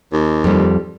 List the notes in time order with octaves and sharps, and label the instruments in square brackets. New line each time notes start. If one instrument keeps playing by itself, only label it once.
[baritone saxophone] D#2
[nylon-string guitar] F2 G3